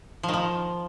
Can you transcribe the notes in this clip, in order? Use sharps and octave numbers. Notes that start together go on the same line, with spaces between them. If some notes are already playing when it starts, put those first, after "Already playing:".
F3
D#3
F3